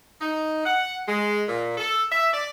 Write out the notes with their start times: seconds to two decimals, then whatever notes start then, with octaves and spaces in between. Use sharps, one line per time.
0.22 D#4
0.66 F#5
1.08 G#3
1.49 A#2
1.78 A4
2.12 E5
2.34 D5